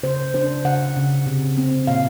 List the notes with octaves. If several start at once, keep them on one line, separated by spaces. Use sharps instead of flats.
C#3 C5
D4 C5
C#3 F#5
C#3
C3
C4
A#2 F5